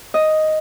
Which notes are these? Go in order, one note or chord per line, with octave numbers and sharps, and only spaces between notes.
D#5